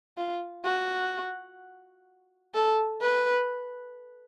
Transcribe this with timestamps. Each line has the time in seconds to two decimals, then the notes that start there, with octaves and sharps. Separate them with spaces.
0.17 F4
0.65 F#4
2.55 A4
3.02 B4